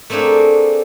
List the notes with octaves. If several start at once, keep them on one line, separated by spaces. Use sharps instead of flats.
A3 A#3 C4 D4 G#4